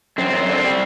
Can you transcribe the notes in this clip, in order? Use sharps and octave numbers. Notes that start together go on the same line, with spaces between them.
F#2 C4
F#2
D3
G3